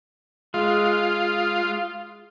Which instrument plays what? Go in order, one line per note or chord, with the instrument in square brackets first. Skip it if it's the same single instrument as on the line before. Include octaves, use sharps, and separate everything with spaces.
[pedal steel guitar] G#3 [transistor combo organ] F4